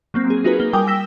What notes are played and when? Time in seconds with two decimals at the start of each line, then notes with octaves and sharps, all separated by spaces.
0.14 F#3 A#3 C4
0.30 G#4
0.44 D#4 F4 F#4 G#4 A#4 B4
0.60 A#3 G7
0.73 G3 A#4 G5 G#5 D6 D#6
0.87 G5 E6 A#6 B6 E7 G7